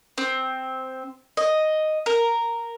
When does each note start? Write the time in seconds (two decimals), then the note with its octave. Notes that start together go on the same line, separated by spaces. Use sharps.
0.18 C4
1.37 D#5
2.06 A#4